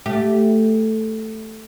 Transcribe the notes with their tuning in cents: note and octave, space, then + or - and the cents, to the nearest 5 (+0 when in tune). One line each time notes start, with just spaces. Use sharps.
A3 +0 G4 +0